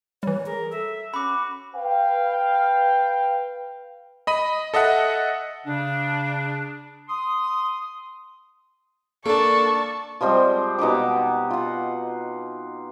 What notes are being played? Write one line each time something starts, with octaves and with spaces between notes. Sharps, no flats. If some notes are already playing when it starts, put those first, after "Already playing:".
E3 G3 C#5
G#4 A#4
A4 E5
C#4 F#4 B5 D6
B4 F5 G5
D#5 B5 D#7
A4 D#5 E5 F#5
C#3 D4
C6 D#6
A#3 D4 A4 D5 A5 C#6
F3 G3 G#3 C4
B2 D#4 G4 D6
F4 F#5